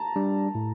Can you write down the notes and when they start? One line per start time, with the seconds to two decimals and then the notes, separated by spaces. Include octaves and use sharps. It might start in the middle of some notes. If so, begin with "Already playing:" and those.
Already playing: A5 A#5
0.16 G3 D4
0.55 A2